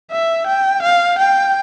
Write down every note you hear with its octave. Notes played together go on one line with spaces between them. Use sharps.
E5
G5
F5
G5